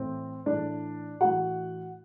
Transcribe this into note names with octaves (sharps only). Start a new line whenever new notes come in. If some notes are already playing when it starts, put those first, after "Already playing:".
Already playing: A2 E3 C4
A2 E3 D4 D5
A2 E3 F#4 F#5